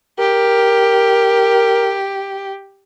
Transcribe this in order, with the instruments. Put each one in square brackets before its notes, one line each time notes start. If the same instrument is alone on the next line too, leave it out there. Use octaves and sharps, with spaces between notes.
[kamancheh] G4 [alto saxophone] A#4